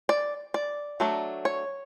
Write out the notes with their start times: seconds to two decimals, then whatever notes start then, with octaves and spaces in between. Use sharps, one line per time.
0.09 D5
0.54 D5
1.00 F#3 A3 D4
1.45 C#5